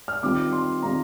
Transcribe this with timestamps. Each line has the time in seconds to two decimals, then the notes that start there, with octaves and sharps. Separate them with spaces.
0.08 F6
0.23 D#3 G3 C4 F4 D6
0.53 C6
0.83 D#3 G3 C4 F4 A#5